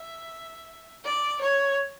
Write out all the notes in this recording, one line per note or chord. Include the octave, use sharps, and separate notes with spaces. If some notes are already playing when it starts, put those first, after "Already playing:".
Already playing: E5
D5
C#5